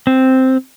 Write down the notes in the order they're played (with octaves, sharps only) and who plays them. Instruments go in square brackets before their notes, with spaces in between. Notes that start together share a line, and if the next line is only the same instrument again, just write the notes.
[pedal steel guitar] C4